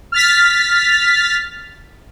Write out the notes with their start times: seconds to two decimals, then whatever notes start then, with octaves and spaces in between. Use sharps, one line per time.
0.12 F6 A6 B6